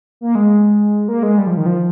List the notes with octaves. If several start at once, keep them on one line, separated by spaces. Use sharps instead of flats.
A#3
G#3
A#3
G#3
G3
F3
D#3
F3